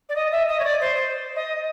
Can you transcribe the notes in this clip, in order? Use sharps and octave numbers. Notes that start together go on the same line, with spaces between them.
D5
D#5
E5
D#5
C#5
D5
C5
C5
D#5